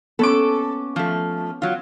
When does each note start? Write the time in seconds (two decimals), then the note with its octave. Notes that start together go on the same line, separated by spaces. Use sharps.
0.19 B3 C#4 A4 D6
0.96 F3 A3
1.62 F#3 F4